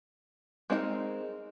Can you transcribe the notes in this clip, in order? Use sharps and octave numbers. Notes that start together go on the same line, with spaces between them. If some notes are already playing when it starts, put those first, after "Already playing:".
G#3 C4 D#4 F#4 A#4